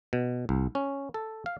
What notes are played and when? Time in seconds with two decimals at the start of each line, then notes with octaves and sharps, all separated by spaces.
0.13 B2
0.49 C2
0.75 C#4
1.14 A4
1.46 F5